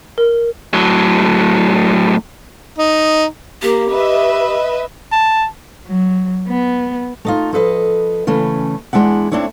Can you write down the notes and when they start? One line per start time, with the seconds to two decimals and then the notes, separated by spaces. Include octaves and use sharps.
0.18 A#4
0.74 A2 F#3
2.78 D#4
3.62 A#3 G4
3.91 B4 D#5 E5
5.12 A5
5.87 F#3
6.48 B3
7.25 A3 D#4 F4
7.53 F3 A4 B4 D#5
8.27 C#3 E3 A3 C#4
8.93 E2 G#3 D4 E4 F#5
9.31 A3 C4 D4 E4 C#5